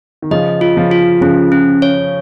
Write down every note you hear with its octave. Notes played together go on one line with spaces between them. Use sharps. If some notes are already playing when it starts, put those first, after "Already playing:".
D#3
C#3 F3 D#5
F4
C#3 F3
F4
C#3 F3 C#4
C#4
C#5